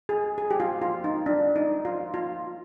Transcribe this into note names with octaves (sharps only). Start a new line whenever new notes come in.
G#4
G#4
G4
F4
F4
D#4
D4
D#4
F4
F4